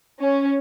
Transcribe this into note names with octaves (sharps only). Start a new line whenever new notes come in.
C#4